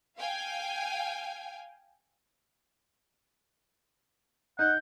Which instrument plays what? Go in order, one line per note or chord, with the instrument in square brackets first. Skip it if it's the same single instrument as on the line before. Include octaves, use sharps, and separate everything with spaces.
[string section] F5 G5 G#5
[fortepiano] D#4 [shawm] F#5 [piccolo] G6